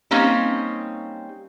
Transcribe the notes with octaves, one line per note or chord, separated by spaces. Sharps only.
G3 A#3 C4 C#4 D#4